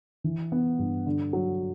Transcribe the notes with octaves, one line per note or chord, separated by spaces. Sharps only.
E3
B3
G2
D3
F#3